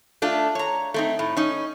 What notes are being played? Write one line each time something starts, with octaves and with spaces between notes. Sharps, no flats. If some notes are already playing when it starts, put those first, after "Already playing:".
A3 D4 F4
C#5 A#5
A3 C4 D#4
A2
C#4 D#4